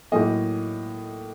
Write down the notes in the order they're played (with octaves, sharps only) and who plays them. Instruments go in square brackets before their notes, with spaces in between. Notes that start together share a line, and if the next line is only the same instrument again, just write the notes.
[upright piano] A2 F#3 A#3 D#5